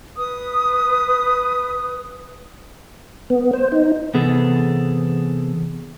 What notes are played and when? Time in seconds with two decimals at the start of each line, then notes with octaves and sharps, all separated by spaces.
0.16 B4 D#6
3.30 B3
3.53 C5
3.72 D#4
4.14 C3 E3 B3 G#4 A4